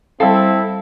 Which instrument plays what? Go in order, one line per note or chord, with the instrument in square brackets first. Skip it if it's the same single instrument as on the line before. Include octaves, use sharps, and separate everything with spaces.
[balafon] G3 F5 [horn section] C4 E4 [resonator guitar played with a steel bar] A4